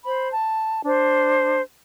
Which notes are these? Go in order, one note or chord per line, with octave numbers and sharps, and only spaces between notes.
C5 B5
A5
D4 C5